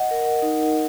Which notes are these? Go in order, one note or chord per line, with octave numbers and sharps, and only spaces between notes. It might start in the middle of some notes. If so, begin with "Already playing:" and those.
Already playing: D#5 F#5
A#4
D#4